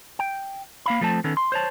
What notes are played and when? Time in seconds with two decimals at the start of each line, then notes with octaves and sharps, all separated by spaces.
0.19 G5
0.86 A#3 F5 B5
1.01 F3 A3 C4 A5
1.24 D#3 B3 C#4 A4
1.37 C6
1.52 C5 C#5 A5